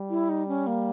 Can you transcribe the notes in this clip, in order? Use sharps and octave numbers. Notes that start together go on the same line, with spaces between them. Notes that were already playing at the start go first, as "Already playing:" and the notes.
Already playing: G3
E4
D#4
C#4
A#3